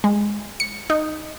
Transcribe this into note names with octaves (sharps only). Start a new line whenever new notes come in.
G#3
C#7
D#4